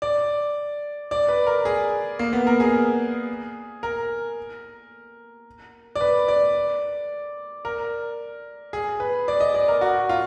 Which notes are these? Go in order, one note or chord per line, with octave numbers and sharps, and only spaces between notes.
D5
D5
B4
A#4
G#4
A#3
B3
A#4
G#4
A#4
D5
B4
D5
A#4
G#4
B4
D5
D#5
D5
A#4
F#4
F4